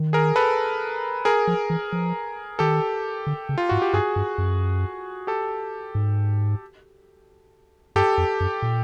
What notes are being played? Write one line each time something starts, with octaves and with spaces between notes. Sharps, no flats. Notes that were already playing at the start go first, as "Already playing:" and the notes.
Already playing: D#3
G#4 A#4
A4 B4
G#4 A#4
F3
E3
F3
D#3 G4 A4
D3
C#3
F4
G#2 F#4
G4
G2 F#4 G#4
G2
F#2
G4 A4
G#2
G2 G4 A4
F2
F#2
A#2